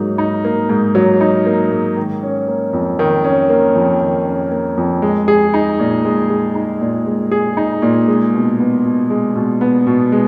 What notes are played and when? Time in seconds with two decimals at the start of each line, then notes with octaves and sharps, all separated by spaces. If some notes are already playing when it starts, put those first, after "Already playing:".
Already playing: G#2 F#3 A#3 D#4
0.18 D#4
0.44 A#3
0.69 G#2
0.95 F#3
1.21 D#4
1.46 A#3
1.71 G#2
1.97 D#3
2.23 C#4
2.48 A#3
2.73 F2
2.99 D#3
3.24 C#4
3.50 A#3
3.75 F2
4.00 D#3
4.26 C#4
4.51 A#3
4.77 F2
5.02 G#3
5.28 G#4
5.54 D#4
5.79 A#2
6.05 G#3
6.30 G#4
6.55 D#4
6.81 A#2
7.06 G#3
7.32 G#4
7.57 D#4
7.82 A#2
8.08 G#3
8.33 B2
8.60 B3
8.85 B2
9.10 G#3
9.35 B2
9.61 B3
9.87 B2
10.12 G#3